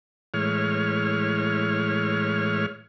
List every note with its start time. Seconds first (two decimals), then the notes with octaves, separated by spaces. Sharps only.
0.34 A2 E3 G#3 C#5 F6